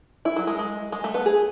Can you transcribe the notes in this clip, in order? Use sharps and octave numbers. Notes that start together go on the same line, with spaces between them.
E4
F#3
G#3
G#3
G#3
A3
B3
G#4